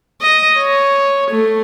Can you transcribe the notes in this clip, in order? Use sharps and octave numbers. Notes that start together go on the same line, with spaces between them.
D#5
C#5
A3